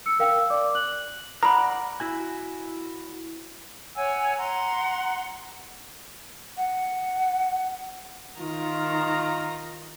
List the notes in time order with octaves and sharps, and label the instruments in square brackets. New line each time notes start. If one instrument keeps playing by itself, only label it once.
[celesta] E6 C#7
A#4 F5 G5 E6
D5 D6
F#6 F#7
[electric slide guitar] A#4 D5 F#5 [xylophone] A#5 B5
[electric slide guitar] E4 F#4 G#5
[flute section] C#5 F#5 G#5 E6
F#5 A#5 C6
[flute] F#5
[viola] D#3 A#5 [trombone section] F4